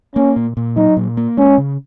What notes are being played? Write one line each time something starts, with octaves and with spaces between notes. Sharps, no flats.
A#3 C#4
A#2
A#2
F#3 D#4
A#2
A#3
G#3 C#4
C#3